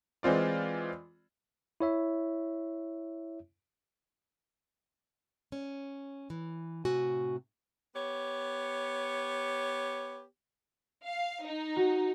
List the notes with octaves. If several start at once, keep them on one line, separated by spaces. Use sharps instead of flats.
E3 G#3 C4 F4 D5
E4 C#5 E5
C#4
E3
A2 C3 F#4 G#5
B3 G4 C#5
F5
D#4
F#4